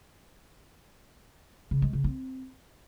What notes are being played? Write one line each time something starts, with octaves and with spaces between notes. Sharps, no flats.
C#3
G#3
C#3
C4